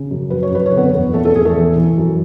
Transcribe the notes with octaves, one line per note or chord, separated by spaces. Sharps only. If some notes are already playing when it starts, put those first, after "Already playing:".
Already playing: C#3
F#2
F#3 B4
C#5
F#2 B4
C#5
D3
B3 B4
E2
E2 A3 A4
A3 A4
E2 G#4
A3 A4
E3
E3
F#2